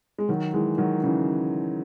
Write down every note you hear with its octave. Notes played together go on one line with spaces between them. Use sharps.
G#3
D#3 F#3
E3 G#3
D#3 F#3
C#3 E3